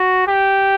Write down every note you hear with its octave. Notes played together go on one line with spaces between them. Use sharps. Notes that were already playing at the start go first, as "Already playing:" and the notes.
Already playing: F#4
G4